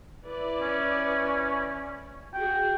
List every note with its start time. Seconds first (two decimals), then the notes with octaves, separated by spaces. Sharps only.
0.24 E4 B4 D5
0.61 C#4
2.33 F#4 G#4 G5